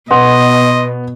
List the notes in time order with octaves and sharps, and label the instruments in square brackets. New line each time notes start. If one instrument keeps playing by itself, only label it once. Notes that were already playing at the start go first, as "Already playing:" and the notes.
[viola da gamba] B2 [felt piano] B3 [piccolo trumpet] D#5 [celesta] C6